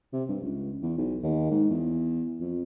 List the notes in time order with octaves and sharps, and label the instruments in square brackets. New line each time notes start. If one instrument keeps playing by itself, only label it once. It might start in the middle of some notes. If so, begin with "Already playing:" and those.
[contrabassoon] C3
G2
C#2
E2
B1
D#2
G#2
E2
F2